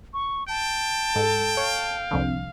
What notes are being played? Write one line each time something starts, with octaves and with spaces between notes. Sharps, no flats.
C#6
G5 A5
G#2 A4
C#5 F5
C2 F2 D3